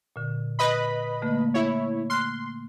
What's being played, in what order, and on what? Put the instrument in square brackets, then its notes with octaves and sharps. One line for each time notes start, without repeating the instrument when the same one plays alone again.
[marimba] A#2 D3
[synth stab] B4 D#5 B5
[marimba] D3 A3 A#3
[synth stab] E4 C#5
[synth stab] C6 [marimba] F6 F#6